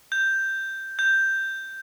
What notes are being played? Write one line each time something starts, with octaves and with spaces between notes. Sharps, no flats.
G6
G6